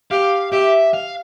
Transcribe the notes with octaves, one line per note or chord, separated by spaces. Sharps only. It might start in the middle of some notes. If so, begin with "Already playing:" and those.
G4 F5
G4 E5
F5